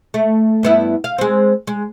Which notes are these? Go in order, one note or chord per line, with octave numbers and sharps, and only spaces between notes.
A3
G2 B3 E4
F5
G#3 C4
G#3